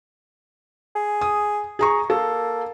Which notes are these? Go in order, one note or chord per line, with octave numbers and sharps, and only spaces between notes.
G#4
D#6
G#4 A#5 C#6
A#3 A4